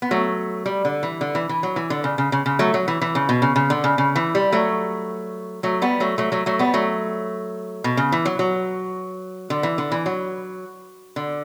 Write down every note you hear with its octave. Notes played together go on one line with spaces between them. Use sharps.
B3
F#3 A3
G3
D3
E3
D3
E3
E3
F#3
E3
D3
C#3
C#3
C#3
C#3
F#3 A3
F#3
E3
E3
C#3
B2
C#3
C#3
D3
C#3
C#3
E3
G3
F#3 A3
F#3 A3
G3 B3
F#3 A3
F#3 A3
F#3 A3
F#3 A3
G3 B3
F#3 A3
B2
C#3
E3
F#3
F#3
D3
E3
D3
E3
F#3
D3